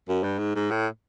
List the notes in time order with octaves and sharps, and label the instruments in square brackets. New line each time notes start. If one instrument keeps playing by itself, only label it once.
[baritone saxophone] F#2
G2
G#2
G#2
A2